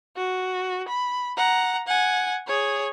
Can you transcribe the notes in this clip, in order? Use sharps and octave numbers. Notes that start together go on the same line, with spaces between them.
F#4
B5
F#5 A#5
F#5 G#5
G#4 C#5